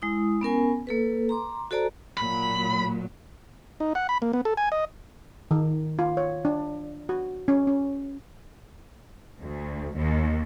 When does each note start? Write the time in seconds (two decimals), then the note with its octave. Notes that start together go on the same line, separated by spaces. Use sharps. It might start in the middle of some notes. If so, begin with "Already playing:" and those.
0.02 G#3 E4 D#6
0.41 B3 C#4 A#4 G#5
0.87 A#3 A4 B4
1.29 A#5 C6 D6
1.71 F#4 A4 C5 D5 A5 A#5
2.17 A#2 F#3 B5
3.80 D#4
3.95 F#5
4.09 B5
4.22 A#3
4.33 B3
4.45 A4
4.57 G#5
4.72 D#5
5.51 D#3
5.99 F4
6.17 C#5
6.45 D4
7.09 F#4
7.48 C#4
7.67 C#4
9.41 D2
9.95 D#2